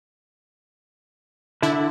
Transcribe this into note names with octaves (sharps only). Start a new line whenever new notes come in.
D3 E4